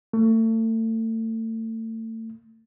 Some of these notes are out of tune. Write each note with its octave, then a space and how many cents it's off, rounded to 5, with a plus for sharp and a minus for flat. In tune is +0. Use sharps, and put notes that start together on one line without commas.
A3 +35